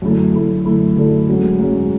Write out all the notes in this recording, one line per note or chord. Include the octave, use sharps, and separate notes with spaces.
F#2 D3 A3 E4 A4
F#2 D3 A3 E4 A4
F#2 D3 A3 E4 A4
F#2 D3 A3 E4 A4
G#2 F#3 C#4
G#2 F#3 C#4